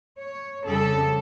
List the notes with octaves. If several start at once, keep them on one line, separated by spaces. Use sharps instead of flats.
C#5
F2 C#3 G3 A4